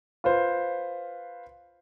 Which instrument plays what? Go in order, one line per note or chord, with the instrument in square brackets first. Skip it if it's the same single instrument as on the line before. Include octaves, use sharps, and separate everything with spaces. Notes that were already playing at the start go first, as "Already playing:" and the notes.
[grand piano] F4 B4 C5